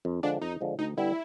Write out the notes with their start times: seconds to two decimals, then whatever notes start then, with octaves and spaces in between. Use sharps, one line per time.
0.05 F2
0.23 D3 F3 G#3 D4
0.41 F2 D#4
0.61 D3 F3 G#3
0.79 D2 D#4
0.97 D3 G3 B3 E4